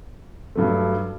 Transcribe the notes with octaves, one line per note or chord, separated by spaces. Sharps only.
G2 F#3 A3